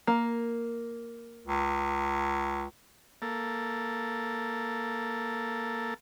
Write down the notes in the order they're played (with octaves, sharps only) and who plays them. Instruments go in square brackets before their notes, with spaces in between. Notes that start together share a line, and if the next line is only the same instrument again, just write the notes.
[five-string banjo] A#3
[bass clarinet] C#2
[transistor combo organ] A#3 A4